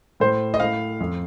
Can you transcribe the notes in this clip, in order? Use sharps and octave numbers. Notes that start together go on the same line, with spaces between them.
A2 C5
D#5
A2 F5
F2